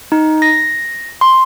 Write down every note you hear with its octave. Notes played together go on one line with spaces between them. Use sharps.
D#4
A#6
C6